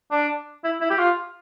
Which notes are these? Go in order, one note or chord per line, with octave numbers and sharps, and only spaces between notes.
D4
E4
E4
G4
F4